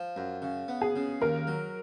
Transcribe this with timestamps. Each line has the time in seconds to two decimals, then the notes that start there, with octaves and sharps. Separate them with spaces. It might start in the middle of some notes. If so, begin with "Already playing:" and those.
Already playing: F3
0.16 F#2
0.42 C#3
0.68 B3
0.82 G#4
0.96 C#3
1.21 D#2 A#4
1.47 F#3